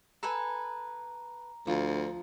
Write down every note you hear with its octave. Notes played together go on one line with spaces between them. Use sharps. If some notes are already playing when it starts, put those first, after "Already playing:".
A4 B4 G#5 A#5
D2 F3